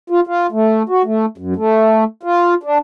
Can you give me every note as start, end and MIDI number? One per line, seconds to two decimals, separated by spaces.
0.10 0.20 65
0.27 0.47 65
0.52 0.83 57
0.89 1.02 66
1.05 1.26 57
1.38 1.54 42
1.56 2.04 57
2.23 2.54 65
2.63 2.78 62